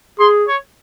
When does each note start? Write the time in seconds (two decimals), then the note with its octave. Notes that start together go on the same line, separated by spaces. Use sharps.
0.19 G#4 C6
0.48 C#5